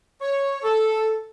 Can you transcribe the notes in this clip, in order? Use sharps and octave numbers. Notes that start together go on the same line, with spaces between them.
C#5
A4